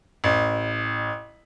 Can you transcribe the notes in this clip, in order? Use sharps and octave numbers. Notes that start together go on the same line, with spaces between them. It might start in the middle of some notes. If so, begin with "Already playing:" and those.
A1